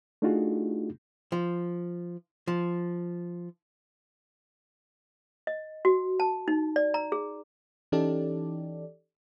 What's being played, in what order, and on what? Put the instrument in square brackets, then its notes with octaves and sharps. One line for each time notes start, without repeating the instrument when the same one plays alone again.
[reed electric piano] A3 D4 D#4 F4 F#4 G#4
[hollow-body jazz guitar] F3
F3
[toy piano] D#5
F#4
A5
D#4
D5
A#5
G#4
[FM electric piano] E3 C#4 D#4 G4 A4 D5